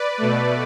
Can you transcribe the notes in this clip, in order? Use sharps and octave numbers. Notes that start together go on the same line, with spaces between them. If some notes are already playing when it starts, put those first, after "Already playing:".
Already playing: B4 D5
B2 A3